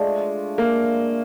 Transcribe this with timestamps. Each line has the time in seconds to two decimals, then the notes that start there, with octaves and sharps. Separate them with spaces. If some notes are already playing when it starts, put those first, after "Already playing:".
Already playing: G#3 A3 D4 F4
0.58 A#3